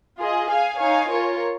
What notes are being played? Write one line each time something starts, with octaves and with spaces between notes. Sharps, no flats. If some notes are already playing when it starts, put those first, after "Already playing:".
F4 G#4 D#5
G#4 F5 G#5
D#4 C#5 F5 G#5
F4 A#4 C#5